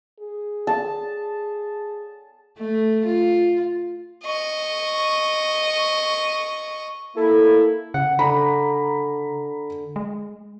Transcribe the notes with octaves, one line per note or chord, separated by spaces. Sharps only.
G#4
A5
A3
F4
D#5 C#6
A#3 E4 A4
C#3 F#5
D3 A#5 B5
G#3